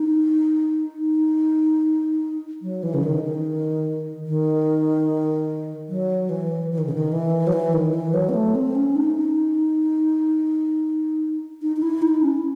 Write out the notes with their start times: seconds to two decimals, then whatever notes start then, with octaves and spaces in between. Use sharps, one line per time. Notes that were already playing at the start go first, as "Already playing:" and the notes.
Already playing: D#4
0.99 D#4
2.62 F#3
2.83 E3
2.94 C#3
3.03 D#3
3.23 D#3
4.26 D#3
5.89 F#3
6.29 E3
6.71 E3
6.78 D#3
6.86 C#3
6.94 D#3
7.12 E3
7.47 F#3
7.53 E3
7.73 D#3
7.93 E3
8.14 F#3
8.29 C4
8.34 A3
8.55 C4
8.75 C#4
8.96 D#4
9.16 D#4
11.62 D#4
11.76 D#4
11.82 E4
12.02 D#4
12.22 C#4